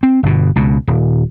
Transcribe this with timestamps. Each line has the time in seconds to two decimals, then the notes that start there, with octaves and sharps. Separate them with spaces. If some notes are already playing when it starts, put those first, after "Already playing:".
0.03 C4
0.23 G1 B2
0.56 C#2 B2
0.87 D#1